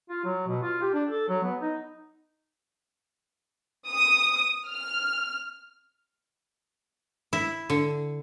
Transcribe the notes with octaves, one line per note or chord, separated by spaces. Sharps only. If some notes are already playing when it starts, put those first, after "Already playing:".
F4
F#3
B2
F4
G4
D4
A4
F#3
B3
D#4
D#6
F6
E4
D3